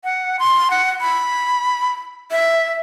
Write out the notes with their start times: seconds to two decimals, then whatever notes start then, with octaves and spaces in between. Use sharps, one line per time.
0.04 F#5
0.39 C6
0.71 F#5
1.01 B5
2.31 E5